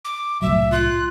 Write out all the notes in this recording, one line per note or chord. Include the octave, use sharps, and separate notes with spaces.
D6
C2 A2 F#3 E5
F4 F#6